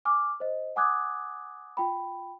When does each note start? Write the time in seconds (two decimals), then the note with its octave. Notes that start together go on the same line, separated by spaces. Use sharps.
0.05 G#5 D6 F6
0.40 C5 D#5
0.76 F#5 G#5 D6 D#6 F#6 G#6
1.77 F4 G5 B5